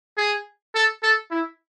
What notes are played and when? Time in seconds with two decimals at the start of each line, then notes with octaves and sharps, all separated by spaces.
0.17 G#4
0.74 A4
1.03 A4
1.31 E4